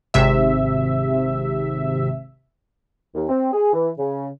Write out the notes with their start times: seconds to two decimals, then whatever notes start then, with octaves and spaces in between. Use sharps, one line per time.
0.14 G#1 C3 E5
3.15 D#2
3.29 C4
3.53 G#4
3.73 E3
3.98 C#3